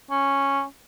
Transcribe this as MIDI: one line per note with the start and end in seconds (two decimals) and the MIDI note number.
0.11 0.63 61